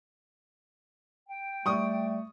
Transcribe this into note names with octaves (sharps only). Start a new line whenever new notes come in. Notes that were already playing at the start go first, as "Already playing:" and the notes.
G5
G3 A3 D5 C#6 D#6